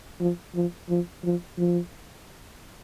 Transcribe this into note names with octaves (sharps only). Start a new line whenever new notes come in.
F3
F3
F3
F3
F3